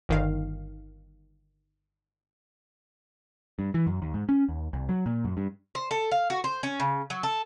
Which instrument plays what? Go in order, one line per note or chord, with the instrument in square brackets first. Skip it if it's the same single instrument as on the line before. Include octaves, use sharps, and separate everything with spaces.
[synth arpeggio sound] G1 D#3 F5
[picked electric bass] G2
E3
F#2
D#2
G#2
C#4
D#2
C2
F#3
A#2
F#2
G2
[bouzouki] C5
A4
F5
F#4
C5
C#4
C#3
F#3
A4